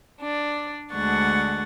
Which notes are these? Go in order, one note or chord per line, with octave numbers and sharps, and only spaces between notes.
D4 D5
D2 G#3 D4 F#5 C#6 A6